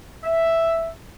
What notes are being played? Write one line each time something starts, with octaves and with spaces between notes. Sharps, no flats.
E5